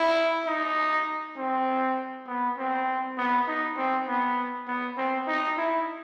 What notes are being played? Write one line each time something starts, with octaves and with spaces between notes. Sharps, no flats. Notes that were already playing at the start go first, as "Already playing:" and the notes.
Already playing: E4
D#4
C4
B3
C4
B3
D#4
C4
B3
B3
C4
D#4
E4